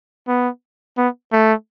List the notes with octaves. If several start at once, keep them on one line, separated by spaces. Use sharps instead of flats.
B3
B3
A3